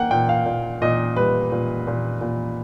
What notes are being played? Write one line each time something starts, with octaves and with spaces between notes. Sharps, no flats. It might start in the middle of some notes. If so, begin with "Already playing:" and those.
Already playing: A#3 F#5 G5
A#2 G5
F5
A#2
A#2 D#5
G3 B4
A#2
A#2
A#2